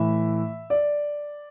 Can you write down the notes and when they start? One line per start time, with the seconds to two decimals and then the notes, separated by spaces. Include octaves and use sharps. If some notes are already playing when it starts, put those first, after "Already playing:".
Already playing: A2 E3 E5
0.70 D5